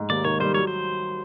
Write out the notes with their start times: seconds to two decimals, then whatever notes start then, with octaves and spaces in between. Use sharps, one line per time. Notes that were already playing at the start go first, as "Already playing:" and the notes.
Already playing: G#2
0.10 D#2 D5
0.25 D#3 C#5
0.40 G3 C5
0.54 F#3 C#5
0.67 C5